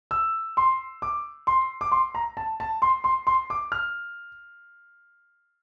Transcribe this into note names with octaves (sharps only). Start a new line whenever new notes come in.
E6
C6
D6
C6
D6
C6
A#5
A5
A5
C6
C6
C6
D6
F6